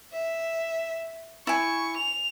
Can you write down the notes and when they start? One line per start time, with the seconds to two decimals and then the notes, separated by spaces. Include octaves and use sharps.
0.12 E5
1.47 E4 G#5 C#6
1.97 F7